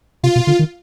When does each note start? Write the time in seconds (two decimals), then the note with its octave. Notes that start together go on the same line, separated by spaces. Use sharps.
0.23 C3 F4
0.36 B2
0.47 D3
0.59 D#3